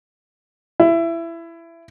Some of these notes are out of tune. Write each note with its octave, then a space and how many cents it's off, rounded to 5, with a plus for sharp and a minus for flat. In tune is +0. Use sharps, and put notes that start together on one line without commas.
E4 +20